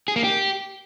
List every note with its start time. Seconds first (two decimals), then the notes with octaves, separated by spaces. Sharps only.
0.08 G#4
0.16 A#3
0.24 G4